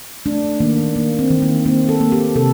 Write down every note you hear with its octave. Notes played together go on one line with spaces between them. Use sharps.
A3 D4
D#3 A#3
D#3 A#3
C4
D#3
A#3
A#3 C4
A4
A#3
G4
C3 A4